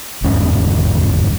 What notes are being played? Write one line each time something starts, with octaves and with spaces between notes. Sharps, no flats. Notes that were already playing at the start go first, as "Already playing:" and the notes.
G1 E2 G#2 C#4